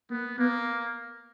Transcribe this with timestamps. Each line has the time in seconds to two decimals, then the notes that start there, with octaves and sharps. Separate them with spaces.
0.10 A#3 B3
0.38 A#3 B3